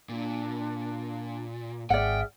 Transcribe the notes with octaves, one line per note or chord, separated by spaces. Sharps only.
A#2 D4
G#1 G#4 D5 E5 F#5 G5 F6